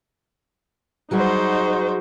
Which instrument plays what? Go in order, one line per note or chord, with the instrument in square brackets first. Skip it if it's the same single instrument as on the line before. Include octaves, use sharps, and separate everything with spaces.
[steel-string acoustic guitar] F#3 G3 G#4 [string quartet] D#4 F#4 C5